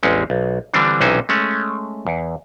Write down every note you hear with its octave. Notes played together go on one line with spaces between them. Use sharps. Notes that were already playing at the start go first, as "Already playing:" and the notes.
A1 E2 G#3 C4 C#4
B1
D3 E3 G3 C4 D4
B1 C3 E3 C#4 D#4 C5
G#3 A3 C#4
E2